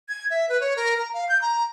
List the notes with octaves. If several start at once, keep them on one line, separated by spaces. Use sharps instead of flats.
G#6
E5
B4
C#5
A#4
A#5
F5
G6
A#5